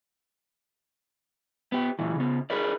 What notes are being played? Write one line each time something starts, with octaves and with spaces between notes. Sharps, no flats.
B3 G4
A#2 E3
C#3 B3
G#4 A#4 B4 D5